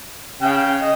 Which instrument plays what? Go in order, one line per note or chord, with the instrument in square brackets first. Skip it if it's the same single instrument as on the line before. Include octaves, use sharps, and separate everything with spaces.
[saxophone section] C#3 [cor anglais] G5
[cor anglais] D#5